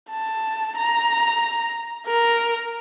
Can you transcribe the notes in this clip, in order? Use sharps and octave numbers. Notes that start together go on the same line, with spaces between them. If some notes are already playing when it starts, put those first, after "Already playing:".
A5
A#5
A#4